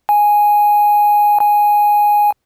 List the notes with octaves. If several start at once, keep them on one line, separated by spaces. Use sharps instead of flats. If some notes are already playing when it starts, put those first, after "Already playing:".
G#5
G#5